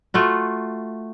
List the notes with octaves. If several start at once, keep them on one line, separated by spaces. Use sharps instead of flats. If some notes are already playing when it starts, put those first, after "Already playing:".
A3 F4 F#4